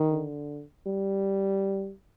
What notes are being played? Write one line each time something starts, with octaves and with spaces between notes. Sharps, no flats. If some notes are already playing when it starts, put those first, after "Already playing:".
Already playing: D#3
D3
G3